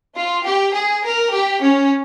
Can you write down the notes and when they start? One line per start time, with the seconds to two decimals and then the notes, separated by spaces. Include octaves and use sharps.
0.15 F4
0.45 G4
0.73 G#4
1.04 A#4
1.33 G4
1.61 C#4